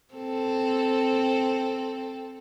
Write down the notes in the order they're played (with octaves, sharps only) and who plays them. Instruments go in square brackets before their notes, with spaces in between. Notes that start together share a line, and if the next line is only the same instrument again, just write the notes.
[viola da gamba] C4 A4